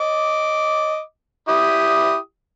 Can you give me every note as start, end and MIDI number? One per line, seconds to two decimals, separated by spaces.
0.01 1.00 75
0.01 1.00 86
1.48 2.16 64
1.48 2.16 67
1.48 2.16 87